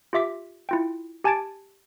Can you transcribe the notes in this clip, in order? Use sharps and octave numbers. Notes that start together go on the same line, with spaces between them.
F4 G4 E5 D6 B6
E4 F4 G5
G4 G#5 A5 G#6 A6 D7